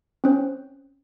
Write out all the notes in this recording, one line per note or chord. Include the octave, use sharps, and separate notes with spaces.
C4 C#4 C5